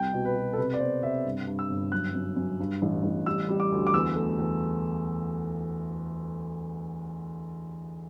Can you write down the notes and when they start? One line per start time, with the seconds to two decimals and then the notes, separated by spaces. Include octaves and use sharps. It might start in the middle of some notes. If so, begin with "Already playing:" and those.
Already playing: C2 G5
0.13 B2
0.25 B4
0.35 B2
0.53 A4
0.58 C3 B4
0.74 D5
0.80 B3 C5
1.03 C3 E5
1.24 G2
1.47 G2
1.59 E6
1.69 G1
1.92 F#2 F#6
2.14 F#2
2.36 F#2
2.60 G2
2.82 A1
3.04 A1
3.26 G3 E6
3.49 G3
3.60 D6
3.72 D2
3.87 D6
3.94 E2 E6
4.15 A3
4.39 E2